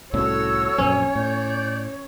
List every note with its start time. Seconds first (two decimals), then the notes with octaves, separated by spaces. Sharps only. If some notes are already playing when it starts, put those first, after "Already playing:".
0.13 C2 A2 C#4 F#4 A4 C#5 E6
0.78 A#1 F#2 C4 C#4
1.15 A2 D5 G6